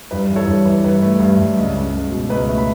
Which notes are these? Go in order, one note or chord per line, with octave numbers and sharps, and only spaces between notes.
G2 B4
E3
A4 C#5
G2
E3
G2 B4
A3
G2
G2
C#2
C#2
C#2
B2
C#2 B4
A3
B5